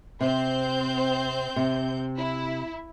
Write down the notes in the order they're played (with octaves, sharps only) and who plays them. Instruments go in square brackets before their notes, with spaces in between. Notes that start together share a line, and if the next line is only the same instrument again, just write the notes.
[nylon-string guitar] C3 [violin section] C4 C5 G6
[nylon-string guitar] C3
[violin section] E4